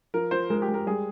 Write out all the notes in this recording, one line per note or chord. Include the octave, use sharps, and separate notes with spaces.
F3 A#4
F3 C5
G#3 A#4
G4
G#3
A#4
G3 G#4